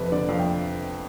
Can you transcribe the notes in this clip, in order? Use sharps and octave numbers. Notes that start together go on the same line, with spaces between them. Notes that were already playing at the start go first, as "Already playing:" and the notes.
Already playing: F2 C3 B4
D3 D5
F2 F5
G5